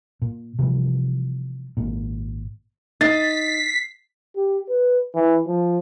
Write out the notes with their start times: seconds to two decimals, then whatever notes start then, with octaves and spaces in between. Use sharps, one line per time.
0.22 A#2
0.59 C3 E3 F3 G3
1.77 G#1 A#2
3.01 D#4 A6 B6 C7
4.36 G4
4.69 B4
5.15 E3
5.47 F3